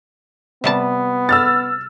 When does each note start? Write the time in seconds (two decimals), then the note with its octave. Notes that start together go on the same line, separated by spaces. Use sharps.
0.64 C3 G3 B3 A5
1.29 E6 F6 A6